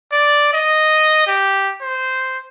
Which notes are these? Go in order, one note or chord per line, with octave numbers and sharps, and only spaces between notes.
D5
D#5
G4
C5